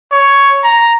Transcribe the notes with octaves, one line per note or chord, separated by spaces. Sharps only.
C#5
A#5